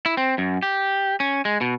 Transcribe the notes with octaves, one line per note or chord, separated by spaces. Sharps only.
E4
C4
F#2
G4
C#4
G#3
B2